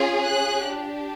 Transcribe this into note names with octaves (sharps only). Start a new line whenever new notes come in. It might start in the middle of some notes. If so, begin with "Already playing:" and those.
Already playing: C#4 F4 G#4
F#6
D4 G4